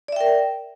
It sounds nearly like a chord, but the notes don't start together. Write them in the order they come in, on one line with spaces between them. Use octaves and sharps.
D5 E5 G5 A#4